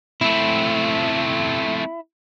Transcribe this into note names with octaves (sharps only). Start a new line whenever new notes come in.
A3 C4 E4